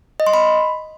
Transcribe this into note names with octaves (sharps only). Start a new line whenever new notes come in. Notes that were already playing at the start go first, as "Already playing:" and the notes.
D#5
C6
B5